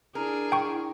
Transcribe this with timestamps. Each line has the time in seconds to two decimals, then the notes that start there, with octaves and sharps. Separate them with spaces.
0.15 D4 E4 G#4 A#4
0.52 G5 C#6